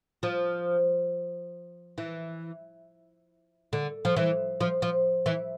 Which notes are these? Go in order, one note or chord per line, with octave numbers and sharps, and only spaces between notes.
F3
E3
D3
F3
E3
F3
F3
E3